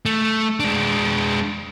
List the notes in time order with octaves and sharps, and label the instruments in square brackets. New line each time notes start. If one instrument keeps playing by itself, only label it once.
[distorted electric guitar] A3
G#3 D4